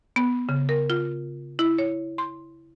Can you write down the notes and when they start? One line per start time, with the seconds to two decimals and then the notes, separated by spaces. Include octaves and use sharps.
0.16 B3
0.49 C#3
0.69 A#4
0.90 F4
1.59 E4
1.78 C#5
2.18 C6